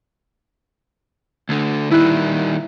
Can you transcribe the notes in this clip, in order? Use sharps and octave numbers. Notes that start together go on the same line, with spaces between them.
D2 D3
D#3 G3 E4 F#6 C7